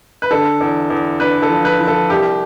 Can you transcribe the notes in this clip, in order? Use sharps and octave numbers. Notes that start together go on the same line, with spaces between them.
B4
D3 A4
E2
E2
D3 B4
A4
F3
B4
F3
A4
C2 G4